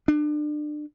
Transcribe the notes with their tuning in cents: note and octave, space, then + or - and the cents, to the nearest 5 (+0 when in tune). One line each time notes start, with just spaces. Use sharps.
D4 +30